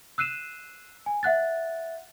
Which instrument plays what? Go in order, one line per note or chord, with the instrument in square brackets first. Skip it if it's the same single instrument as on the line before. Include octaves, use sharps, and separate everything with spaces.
[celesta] E6 F#6 C7 D#7 E7
G#5
E5 F#5 F#6 A6